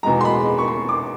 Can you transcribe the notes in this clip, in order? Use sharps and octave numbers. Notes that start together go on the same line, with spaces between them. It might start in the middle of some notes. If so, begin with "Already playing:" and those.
E2 B2 G#3 A#5
C6
B5
B5
C#6
C6
D6